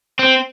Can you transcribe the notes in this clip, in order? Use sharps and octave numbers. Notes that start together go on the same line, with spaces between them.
C4